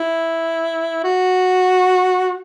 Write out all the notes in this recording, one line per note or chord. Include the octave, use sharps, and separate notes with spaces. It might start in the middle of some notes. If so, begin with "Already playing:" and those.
Already playing: E4
F#4